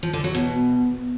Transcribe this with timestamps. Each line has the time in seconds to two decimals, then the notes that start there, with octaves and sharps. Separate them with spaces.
0.03 F3
0.13 D3
0.24 F#3
0.35 B2